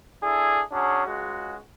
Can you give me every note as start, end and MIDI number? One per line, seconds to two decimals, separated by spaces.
0.22 0.60 62
0.22 0.60 64
0.22 0.60 68
0.22 0.60 69
0.72 1.04 54
0.72 1.04 61
0.72 1.04 62
0.72 1.04 68
1.06 1.57 37
1.06 1.57 56
1.06 1.57 66